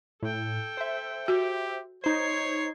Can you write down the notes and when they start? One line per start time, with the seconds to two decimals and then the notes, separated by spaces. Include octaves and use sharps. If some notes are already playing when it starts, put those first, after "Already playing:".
0.23 A2 A4 G5
0.77 C5 E5
1.28 F#4 G4
2.04 D#4 C5 C#5 G#6 C7